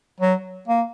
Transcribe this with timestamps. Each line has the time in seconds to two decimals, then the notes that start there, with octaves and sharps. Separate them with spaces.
0.21 F#3
0.68 A#3